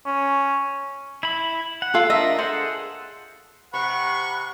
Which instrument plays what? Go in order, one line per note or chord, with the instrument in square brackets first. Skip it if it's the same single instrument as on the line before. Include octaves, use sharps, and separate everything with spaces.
[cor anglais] C#4
[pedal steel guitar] E4 B5
F#5
[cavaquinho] F4 A4
[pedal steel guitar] D4 A#4 D#5 [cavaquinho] E5
[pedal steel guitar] G#4 A4 F#5 [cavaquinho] C5
[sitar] C3 [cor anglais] F#5 [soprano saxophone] B5 [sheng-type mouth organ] C#6